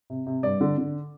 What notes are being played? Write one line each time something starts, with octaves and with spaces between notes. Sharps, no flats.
C3
C3
G2 D5
D3
D3